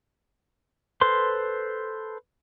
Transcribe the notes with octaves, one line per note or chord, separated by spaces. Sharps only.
A4 B4 C5 C6